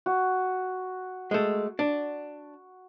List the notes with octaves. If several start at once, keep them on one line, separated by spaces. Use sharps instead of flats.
F#4
G#3 A3
D4